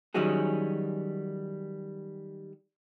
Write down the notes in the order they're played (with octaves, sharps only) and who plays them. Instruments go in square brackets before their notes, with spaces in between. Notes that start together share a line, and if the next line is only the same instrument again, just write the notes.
[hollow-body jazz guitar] D#3 F#3 G3 C#4 F#4 G#4